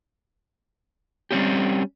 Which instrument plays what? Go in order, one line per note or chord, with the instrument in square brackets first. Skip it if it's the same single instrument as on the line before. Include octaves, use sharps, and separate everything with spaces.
[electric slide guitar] G3 C4 C#4 G4